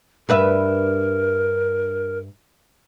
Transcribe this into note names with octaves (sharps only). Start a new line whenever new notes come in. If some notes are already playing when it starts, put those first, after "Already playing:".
G2 A#4 B4 E5